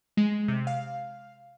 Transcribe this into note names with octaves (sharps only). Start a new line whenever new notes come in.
G#3
C3
F5